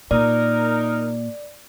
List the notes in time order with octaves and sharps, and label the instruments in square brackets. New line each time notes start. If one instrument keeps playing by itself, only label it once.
[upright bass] A#2 [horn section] D#4 A#4 [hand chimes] D5